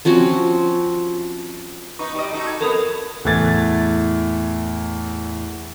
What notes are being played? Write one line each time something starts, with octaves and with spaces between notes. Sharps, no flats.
F3 C4 C#4 F#4
B3 D#4 C#6
G3 D#5
A3 D#4 F#4
G#6
F2 B3 A4 A#4 D#6
E2 A2 A3 G#6 A6